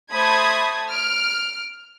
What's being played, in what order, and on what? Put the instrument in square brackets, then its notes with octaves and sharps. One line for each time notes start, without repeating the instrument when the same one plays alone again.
[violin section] A3 C5 A5 B5 D#6 G#6
F6 D7